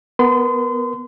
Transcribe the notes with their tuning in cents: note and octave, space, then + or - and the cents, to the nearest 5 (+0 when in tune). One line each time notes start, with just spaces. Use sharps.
B3 +0 A#4 +15 C6 -35